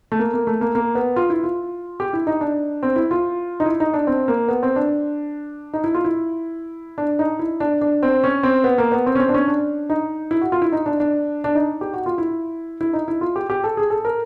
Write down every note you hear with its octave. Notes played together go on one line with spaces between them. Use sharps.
A3
A#3
A#3
A3
A#3
A#3
B3
F4
E4
F4
G4
E4
D#4
D4
C4
E4
F4
D#4
E4
D#4
D4
C4
A#3
B3
C4
D4
D#4
E4
F4
E4
D4
D#4
E4
D4
D4
C4
C#4
C4
B3
A#3
B3
C4
C#4
C4
D4
C#4
D4
D#4
E4
F#4
F4
E4
D#4
D4
D4
D4
D#4
G4
F#4
F4
E4
E4
D#4
E4
F4
G4
G4
A4
G#4
A4
A#4